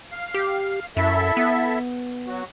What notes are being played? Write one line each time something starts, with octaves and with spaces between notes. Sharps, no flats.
F5
G4
F#2 E4 A4 E5
B3
F#3 F#4